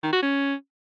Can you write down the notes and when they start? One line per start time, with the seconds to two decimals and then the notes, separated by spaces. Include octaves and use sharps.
0.03 D#3
0.13 F#4
0.22 C#4